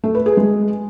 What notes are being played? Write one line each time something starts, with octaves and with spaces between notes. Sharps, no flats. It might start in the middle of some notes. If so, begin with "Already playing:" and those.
A3
B4
G#4
G#3